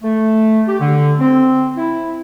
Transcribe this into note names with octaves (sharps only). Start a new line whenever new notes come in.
A3
G4
D3
C4
E4